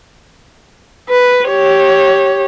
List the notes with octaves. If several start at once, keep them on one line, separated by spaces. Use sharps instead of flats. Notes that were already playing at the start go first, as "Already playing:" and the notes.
B4
G4 C#5